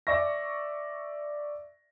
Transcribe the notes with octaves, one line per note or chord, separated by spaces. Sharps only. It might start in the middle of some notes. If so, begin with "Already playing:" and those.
D5 E5 C#6 A#6